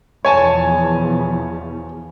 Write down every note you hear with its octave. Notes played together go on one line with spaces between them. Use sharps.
E2 B2 F3 C#5 G#5 A5